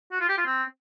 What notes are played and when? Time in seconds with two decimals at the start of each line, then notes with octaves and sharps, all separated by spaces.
0.12 F#4
0.21 F4
0.29 G4
0.38 F4
0.46 C4